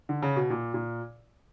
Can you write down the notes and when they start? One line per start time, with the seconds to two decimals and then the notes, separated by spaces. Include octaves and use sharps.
0.09 D3
0.23 C#3
0.36 B2
0.50 A#2
0.74 A#2